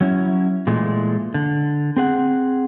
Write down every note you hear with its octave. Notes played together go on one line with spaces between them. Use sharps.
F#3 C#4 E4
A#2 E3 G#3 A3
D3
C4 G#4 F#5